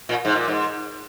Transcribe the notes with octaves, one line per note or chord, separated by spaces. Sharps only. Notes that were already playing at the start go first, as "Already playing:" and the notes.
A#2
G#2
A#2
G#2